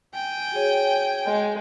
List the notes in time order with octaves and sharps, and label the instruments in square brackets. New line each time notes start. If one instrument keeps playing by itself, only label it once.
[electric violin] G5 [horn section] G#5
[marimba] F#4 G#4 C#5
[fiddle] G#3